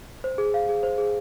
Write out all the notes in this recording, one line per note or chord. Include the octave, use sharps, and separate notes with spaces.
C5
G#4
F5
G#4
C5
G#4